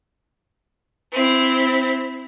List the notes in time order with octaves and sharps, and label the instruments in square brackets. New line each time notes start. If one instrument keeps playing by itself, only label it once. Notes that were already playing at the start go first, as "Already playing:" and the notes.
[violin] C4 E4